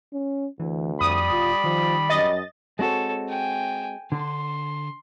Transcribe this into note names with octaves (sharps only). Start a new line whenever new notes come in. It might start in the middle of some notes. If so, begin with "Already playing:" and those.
C#4
D2 E3
F2 G3 D5 B5 D#6
D1 F4
D#3 F3
F#2 D#5 A6
G#3 C4 F#4 A4 C#5
G5 G#5
D3 C6